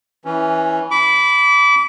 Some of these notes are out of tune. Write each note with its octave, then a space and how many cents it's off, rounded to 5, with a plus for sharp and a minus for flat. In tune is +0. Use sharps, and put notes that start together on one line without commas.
E3 -10 C#4 +0
B5 +0 D6 -30